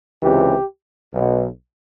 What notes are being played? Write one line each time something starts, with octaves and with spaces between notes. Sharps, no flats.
C#2 C3 E3 G4
B1 B2